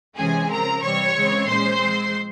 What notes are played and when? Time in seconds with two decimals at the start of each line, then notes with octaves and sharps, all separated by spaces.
0.16 C3 E3 G#3 C#4 G#4 G#5
0.49 C#3 F3 C4 A#4 A#5
0.82 C3 E3 G3 C4 C#5 C#6
1.15 C#3 E3 G#3 C4
1.46 A#2 G#3 C#4 C5 C6
1.80 F3 G#3 C4